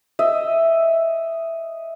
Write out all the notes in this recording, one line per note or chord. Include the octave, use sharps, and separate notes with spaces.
D#5 E5